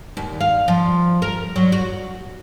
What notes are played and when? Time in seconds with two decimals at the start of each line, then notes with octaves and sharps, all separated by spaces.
0.17 D#2
0.40 F5
0.68 F3
1.22 A#4
1.56 F#3
1.72 F#4